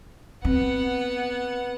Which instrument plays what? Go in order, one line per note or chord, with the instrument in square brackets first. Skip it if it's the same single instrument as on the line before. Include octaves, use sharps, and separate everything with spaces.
[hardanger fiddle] B3 F#5 [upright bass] C4